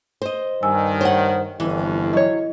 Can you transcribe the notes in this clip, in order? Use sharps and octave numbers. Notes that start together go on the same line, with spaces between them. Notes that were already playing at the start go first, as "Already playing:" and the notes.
C5 D#5
G2 D#3 G#5 E6
C5 C#5 F#5
G1 F2 E3
F#3 C#5 D#5